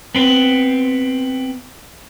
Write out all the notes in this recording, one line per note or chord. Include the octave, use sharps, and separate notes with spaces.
B3 C4